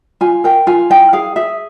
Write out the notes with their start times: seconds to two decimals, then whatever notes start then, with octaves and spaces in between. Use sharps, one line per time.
0.21 F4 G#5
0.44 A#4 G5
0.67 F4 G#5
0.90 E4 G5
1.13 G#4 F5
1.36 G#4 E5